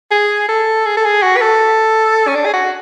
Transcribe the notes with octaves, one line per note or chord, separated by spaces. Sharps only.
G#4
A4
G#4
A4
G#4
F#4
B4
A4
C#4
D4
G#4
F#4